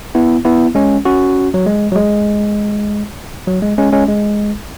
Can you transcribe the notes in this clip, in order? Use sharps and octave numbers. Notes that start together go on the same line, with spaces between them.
B3 E4
B3 E4
G#3 C#4
C#4 F#4
F#3
G#3
F#3
G#3
F#3
G#3
G#3 C#4
G#3 C#4
G#3